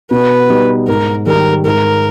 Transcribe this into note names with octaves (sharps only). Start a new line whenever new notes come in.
B2 B4
G3 B3 D#4
G#2 A#4
D#3 G3 A#4
G#2 A#4